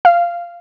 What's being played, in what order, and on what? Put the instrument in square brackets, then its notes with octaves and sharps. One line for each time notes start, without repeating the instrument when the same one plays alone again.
[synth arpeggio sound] F5